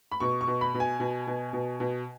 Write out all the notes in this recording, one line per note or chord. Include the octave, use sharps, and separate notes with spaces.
B5
B2 C#6
C#6
B2
B5
B2
G#5
B2
B2
B2
B2